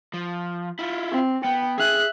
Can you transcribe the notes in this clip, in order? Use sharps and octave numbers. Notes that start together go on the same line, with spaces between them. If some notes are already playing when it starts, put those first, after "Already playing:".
F3
E4 F4
C4
B3 G5
G#4 E5 F#6